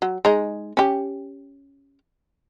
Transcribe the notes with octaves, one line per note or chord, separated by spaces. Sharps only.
F#3
G#3 D#4
C#4 G4